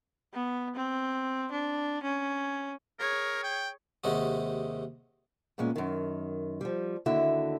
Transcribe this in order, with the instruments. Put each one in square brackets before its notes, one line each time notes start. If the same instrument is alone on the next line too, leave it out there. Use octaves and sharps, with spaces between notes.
[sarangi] B3
C4
D4
C#4
[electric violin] G#4 C#5 [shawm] A#4
[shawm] G5
[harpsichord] D#2 C3 G#3 F#4
[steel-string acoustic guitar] E2 G2 A#2 G#3 C#4
F#2 D#3
F3 G3
D#2 D3 E4 F#4 E5